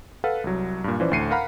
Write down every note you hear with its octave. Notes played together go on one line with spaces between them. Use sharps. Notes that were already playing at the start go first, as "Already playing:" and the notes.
A4 B4 F5 F#5
C2 F#3
G2 A#2
E3 F3 C#4 B4 C5 D5
D2 A2 D4 C7 C#7 D#7
A#4 F5 F#5 A#5 B5 F6